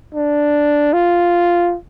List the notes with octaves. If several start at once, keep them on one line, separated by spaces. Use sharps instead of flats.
D4
F4